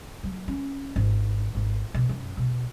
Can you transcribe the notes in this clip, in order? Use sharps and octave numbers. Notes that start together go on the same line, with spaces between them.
F#3
C#4
G#1
G#1
B2
F#2
B2